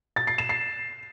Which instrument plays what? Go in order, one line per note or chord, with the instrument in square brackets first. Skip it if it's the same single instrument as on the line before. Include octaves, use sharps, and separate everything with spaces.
[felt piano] A6
C7
E7
C7